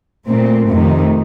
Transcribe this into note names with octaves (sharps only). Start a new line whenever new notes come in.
A#2 A3 C4
F2 C3 D#3 A3